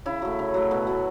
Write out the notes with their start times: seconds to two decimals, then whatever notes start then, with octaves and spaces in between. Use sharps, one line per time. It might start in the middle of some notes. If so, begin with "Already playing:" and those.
0.06 C#3 E4
0.22 F#3 A3
0.39 C#3
0.54 F#3 A3
0.71 B2 B3
0.87 F#3 A3